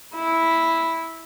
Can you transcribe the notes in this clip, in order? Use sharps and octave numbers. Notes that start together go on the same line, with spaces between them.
E4